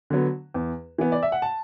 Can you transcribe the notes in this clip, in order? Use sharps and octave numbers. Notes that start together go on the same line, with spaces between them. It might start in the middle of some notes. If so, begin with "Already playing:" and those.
D3 F#3 B3
E2
E3 B3
D5
E5
F#5
A5